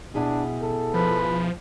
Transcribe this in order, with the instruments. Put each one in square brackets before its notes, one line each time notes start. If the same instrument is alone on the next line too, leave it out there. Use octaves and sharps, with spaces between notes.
[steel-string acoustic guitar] B2 E4 G#4 [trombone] D4
[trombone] A4
[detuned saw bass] F3 [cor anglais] B4